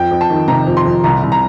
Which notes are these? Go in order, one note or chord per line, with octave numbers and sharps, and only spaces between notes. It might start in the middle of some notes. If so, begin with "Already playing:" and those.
Already playing: F2 G5
F2
A5
D#3
C3 A#5
F2
C6
F2
C2 A#5
C2
A#5